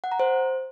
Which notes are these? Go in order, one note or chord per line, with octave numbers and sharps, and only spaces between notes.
F#5
A#5
C5